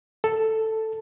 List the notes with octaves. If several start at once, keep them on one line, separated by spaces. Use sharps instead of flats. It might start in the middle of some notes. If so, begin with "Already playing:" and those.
A4